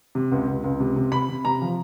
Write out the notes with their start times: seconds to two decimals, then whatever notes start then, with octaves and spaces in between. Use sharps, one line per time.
0.15 C3
0.32 C#2
0.48 C#2
0.64 C#2
0.80 C3
0.96 C3
1.12 C3 B5
1.29 C3
1.45 C3 A#5
1.62 F3